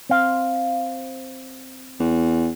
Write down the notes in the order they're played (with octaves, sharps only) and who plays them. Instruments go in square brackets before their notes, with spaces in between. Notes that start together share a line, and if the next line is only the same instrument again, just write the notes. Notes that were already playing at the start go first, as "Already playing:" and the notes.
[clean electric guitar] C4 F5
[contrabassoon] E2